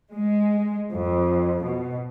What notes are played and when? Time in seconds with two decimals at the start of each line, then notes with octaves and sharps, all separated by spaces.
0.12 G#3
0.93 F2
1.65 B2